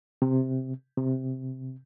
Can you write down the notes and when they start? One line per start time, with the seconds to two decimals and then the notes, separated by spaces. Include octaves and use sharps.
0.22 C3
0.97 C3